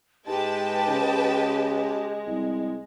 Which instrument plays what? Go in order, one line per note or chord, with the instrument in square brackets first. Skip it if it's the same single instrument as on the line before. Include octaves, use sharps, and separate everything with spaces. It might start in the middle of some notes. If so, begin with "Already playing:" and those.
[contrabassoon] G#2 [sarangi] G#3 [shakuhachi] G4 [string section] B4 G5 A5
[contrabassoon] C#3
C2